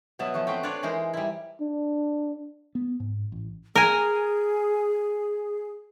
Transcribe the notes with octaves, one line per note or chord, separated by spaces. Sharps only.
B2 F#3 B3 E5 A5
E3 F3 A3 F#4
A3 C4 F#4 B4 F5 G5
D4 F4 B4 C#5 D5 F5
E3 G#3 D#4 A#4 C5
G3 E4
D4
B3
G#2
A1
G#4 A#4 G#5